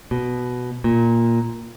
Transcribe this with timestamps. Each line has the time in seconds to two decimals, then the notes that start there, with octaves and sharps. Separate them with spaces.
0.11 B2
0.84 A#2